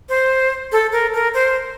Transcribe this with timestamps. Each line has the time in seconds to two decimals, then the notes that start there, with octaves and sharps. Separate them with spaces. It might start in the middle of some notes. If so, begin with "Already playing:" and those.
0.09 C5
0.72 A4
0.92 A#4
1.14 A#4
1.34 C5